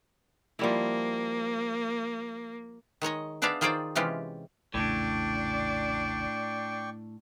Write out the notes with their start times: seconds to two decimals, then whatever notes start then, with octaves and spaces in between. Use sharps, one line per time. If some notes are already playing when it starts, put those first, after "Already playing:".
0.59 F3 G3 A#3 E4
3.02 D#3 G#3 C#5 D#5
3.42 B3 D4 G#4 D5 E5 F5
3.61 D#3 F4 G#4 C5 D5 G5
3.95 C3 E3 G#3 C#4 F4 G4
4.74 A#1 E2 A2 C#3 D4 D5 G5 C#6